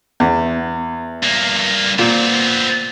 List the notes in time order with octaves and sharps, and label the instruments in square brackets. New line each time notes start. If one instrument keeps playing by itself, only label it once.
[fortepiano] E2
[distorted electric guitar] G2 A#3
[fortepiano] A#2 [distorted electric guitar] B3 C4